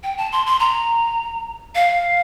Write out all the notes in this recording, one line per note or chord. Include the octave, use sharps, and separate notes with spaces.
G5
A5
C6
C6
A#5
F5